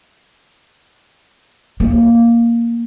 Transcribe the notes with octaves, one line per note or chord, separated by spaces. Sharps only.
A#3